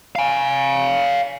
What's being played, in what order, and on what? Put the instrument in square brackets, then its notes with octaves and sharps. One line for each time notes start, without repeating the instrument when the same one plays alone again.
[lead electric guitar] F5 G#5